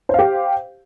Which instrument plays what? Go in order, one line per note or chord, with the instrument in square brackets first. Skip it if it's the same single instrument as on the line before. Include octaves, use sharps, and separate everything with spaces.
[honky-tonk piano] C5
F5
G4